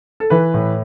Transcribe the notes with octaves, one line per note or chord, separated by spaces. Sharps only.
A4
E3 B4
A2